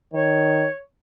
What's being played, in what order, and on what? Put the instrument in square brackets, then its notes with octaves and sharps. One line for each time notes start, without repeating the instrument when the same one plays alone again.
[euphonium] D#3 [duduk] C#5